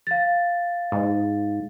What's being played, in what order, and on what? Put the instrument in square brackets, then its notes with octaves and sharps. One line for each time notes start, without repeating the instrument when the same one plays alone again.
[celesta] F5 A6
[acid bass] G#2